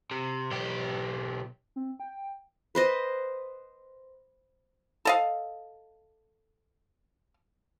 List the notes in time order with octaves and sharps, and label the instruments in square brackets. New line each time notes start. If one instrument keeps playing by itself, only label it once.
[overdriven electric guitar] C3
B1 G4
[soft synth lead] C4
G5
[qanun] B4 C5 D#5
[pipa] A4 D#5 F5